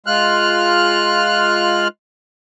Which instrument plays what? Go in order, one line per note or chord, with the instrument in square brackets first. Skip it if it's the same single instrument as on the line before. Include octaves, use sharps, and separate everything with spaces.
[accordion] G#3 F4 F6 F#6